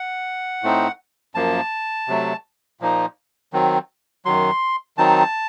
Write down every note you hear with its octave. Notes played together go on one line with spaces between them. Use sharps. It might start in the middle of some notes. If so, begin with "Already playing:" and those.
Already playing: F#5
A2 A3 C4 D#4
F#2 F3 A#3 A5
C3 F#3 A3
A#2 F3 A#3 D#4
D#3 F#3 C4
F#2 D#3 F#3 C6
D#3 F#3 C4 D#4 A5